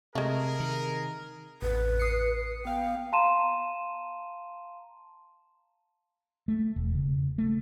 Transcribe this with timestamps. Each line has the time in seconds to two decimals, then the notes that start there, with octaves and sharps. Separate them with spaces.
0.15 C3 G#3 A3 G#4 A#4
0.60 D#3
1.62 A1 F2 B4
1.99 D#6 C7 C#7
2.65 B3 F5 G5
3.12 F5 A5 A#5 C6 D#7 E7
6.48 A3
6.76 E1
6.95 C#3
7.38 A3